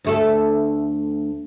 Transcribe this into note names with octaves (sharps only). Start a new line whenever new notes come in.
D2 A3 A4